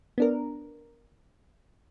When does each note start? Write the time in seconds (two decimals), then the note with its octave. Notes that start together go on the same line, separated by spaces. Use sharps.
0.18 B3 D4 A#4